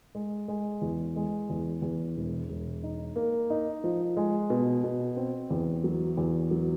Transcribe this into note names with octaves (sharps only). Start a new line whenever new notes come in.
G#3
G#3
E2
G#3
E2
E2
E1
E1
D#4
A#3
D#4
F3
G#3
B2
B2
C4
E2
F#3
E2
F#3